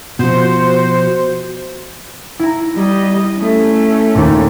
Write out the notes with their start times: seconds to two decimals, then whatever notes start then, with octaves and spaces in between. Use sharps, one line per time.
0.19 B2 F3 F#4 C5
2.40 E4 A#5
2.76 G3 D#5
3.37 A3 C#4
4.15 D#2 A#2